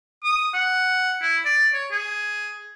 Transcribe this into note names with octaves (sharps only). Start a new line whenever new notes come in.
D#6
F#5
E4
D5
C#5
G#4